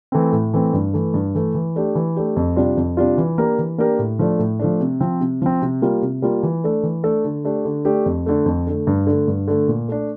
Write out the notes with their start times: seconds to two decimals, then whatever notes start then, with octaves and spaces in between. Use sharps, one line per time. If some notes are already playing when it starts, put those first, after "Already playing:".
0.12 E3 A3 C4
0.32 A2
0.54 E3 A3 C4
0.73 G2
0.94 E3 A3
1.14 G2
1.35 E3 A3
1.55 E3
1.76 A3 D4 G4
1.95 E3
2.16 A3 D4 G4
2.36 F2
2.56 C3 G3 D4 F4
2.77 F2
2.97 C3 G3 D4 F4
3.18 E3
3.38 A#3 D4 G4 A#4
3.59 E3
3.78 A#3 D4 G4 A#4
3.99 A2
4.19 F3 A3 D4
4.39 A2
4.59 F3 A3 D4
4.80 C3
5.01 F3 C4
5.20 C3
5.42 F3 C4
5.62 C3
5.82 G3 A#3 F4
6.02 C3
6.22 G3 A#3 F4
6.43 E3
6.64 A3 D4 A4
6.83 E3
7.03 A3 D4 A4
7.25 D3
7.45 A3 D4 G4
7.65 D3
7.85 A3 D4 G4
8.06 F2
8.26 D3 A3
8.46 F2
8.67 D3 A3
8.87 G2
9.07 D3
9.12 A3
9.28 G2
9.48 D3 A3
9.68 A#2
9.88 A3 D4